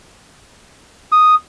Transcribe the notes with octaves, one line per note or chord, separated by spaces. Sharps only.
D#6